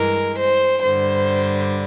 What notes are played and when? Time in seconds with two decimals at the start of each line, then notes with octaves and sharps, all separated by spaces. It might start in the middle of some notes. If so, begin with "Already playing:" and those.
Already playing: G2 E3 G#3 A#4
0.39 C5
0.84 G2 D3 G3 C5